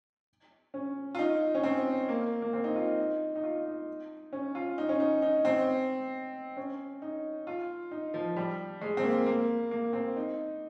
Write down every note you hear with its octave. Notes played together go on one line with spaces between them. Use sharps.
C#4
F4
D#4
C#4
C4
A#3
A#3
C4
D#4
F4
D#4
D#4
D#4
F4
D#4
C#4
F4
D#4
C#4
D#4
D#4
C4
C#4
D#4
F4
D#4
F3
G3
G#3
C4
A#3
A#3
A#3
C4
D#4